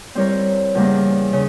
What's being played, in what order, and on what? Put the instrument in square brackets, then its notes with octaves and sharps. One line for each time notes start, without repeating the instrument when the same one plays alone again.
[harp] G3 C4 E4 A#4 C#5
E2 C#3 G3 A#3
C#3